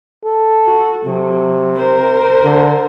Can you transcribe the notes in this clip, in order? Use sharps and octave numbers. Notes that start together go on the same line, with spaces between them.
A4
F#4
C3 F#3
A#4 C5
D3